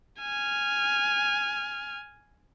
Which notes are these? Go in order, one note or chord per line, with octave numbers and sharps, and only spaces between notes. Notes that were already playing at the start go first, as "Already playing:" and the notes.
G#5 F6